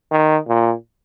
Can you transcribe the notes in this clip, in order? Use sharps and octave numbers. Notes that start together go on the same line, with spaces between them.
D#3
A#2